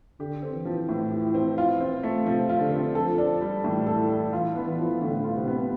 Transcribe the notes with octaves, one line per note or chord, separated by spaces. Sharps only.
D3 G4
C4
E3
F3
A2
G4
C4
F4
C4
A3
C3 F3
F4
D3
C4
F3 A4
D4
G3
A2 E3
A4
D4
E3 F4
B3
E3
F3
A2 D3
F4
C3
B3